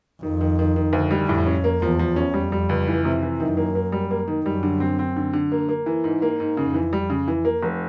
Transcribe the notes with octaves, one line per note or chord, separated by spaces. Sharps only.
F2 D#3
D#3
D#3
D#3
D2
G3
F2 A2
C#4
A#3
E2 F3
F3
C#4
F2 G3
G3
C#2
E3
C3
E3
F#2 D#3
A#3
A#3
G3
A#3
D#3
F#2 G3
D3
C4
C4
D3
D3
A#3
A#3
E3
G#2
A#3
G#2
F2 C#3
E3
G3
C#3
E3
A#3
F1